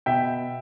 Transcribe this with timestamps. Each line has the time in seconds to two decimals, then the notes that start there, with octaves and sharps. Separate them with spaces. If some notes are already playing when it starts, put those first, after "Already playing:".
0.06 B2 E5 G5